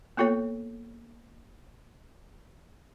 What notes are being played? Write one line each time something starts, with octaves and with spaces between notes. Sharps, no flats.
A#3 B3 F4 A4 C#5